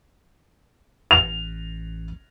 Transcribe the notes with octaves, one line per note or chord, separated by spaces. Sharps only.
A1 F7